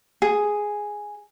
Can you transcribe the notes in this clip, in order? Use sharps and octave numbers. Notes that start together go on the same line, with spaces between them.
G#4